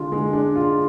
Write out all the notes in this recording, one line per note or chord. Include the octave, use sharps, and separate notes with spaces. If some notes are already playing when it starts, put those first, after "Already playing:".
Already playing: D3 G#3 D4 F4
G#3
D4
F4